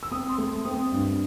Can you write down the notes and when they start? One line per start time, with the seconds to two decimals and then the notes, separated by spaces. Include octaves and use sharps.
0.03 E6
0.11 C4 D#6
0.29 C6
0.38 A3
0.48 C6
0.65 C4 D#6
0.92 G2